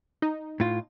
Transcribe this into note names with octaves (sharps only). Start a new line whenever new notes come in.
D#4
A2 F4